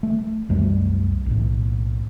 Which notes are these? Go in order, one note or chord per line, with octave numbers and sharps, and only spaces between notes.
A3
C2 F#2 G3 A3
B1 A2